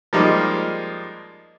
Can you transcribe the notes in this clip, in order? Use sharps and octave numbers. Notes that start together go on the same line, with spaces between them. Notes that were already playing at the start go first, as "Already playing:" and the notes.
F3 G3 G#3 A#3 D#4